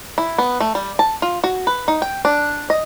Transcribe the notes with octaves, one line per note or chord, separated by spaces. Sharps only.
E4
B3
A3
G3
A5
F4
F#4
B4
D#4
G5
D4
D#5